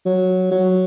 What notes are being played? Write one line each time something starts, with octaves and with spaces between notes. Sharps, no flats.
F#3
F#3